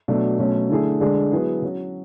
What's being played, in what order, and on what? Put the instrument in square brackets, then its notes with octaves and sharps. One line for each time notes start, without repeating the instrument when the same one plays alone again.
[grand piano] B2 F#3 A3 D4
B2 F#3 A3 C#4
D3 A3 E4 G#4
D3 G#3 D4 G#4
F#3 B3 E4 G#4
F#3 C#4 F#4